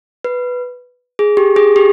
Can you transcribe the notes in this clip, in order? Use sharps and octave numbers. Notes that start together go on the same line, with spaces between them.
B4
G#4
G4
G#4
G4